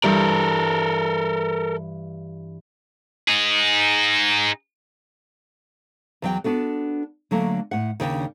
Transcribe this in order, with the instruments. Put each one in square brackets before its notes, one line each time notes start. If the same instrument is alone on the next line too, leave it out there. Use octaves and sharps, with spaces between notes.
[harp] G2 E3 [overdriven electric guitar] A4 A#4
[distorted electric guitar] D#4 G#4
[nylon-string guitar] E2 F#3 G5
B3 D4 F#4 A4
D3 F#3 A3 A#3
A2 F#5
D#2 C#3 D4 G5